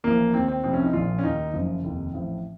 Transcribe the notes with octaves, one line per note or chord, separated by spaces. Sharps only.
A1 A2 F3 A#3
D#2 D#3 C4
C4
C2 C3 F3 C4
C#4
D#4
A#1 A#2 F3 F4
C#4
D#2 D#3 D#4
F#1 F#2 F3
F1 D#2 D#3
A1 A2 F3